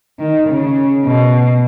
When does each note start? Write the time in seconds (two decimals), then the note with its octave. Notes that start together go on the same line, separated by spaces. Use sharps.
0.20 D#3
0.49 C#3
1.06 B2